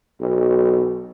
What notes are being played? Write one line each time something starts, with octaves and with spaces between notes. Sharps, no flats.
B1